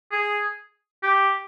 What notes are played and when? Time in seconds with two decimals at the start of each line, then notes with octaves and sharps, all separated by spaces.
0.12 G#4
1.03 G4